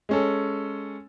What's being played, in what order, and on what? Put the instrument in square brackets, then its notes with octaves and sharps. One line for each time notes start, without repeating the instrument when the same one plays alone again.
[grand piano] G#3 C#4 A4